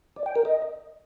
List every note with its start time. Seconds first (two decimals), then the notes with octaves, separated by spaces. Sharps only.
0.16 D5
0.26 G5
0.36 A#4
0.45 D#5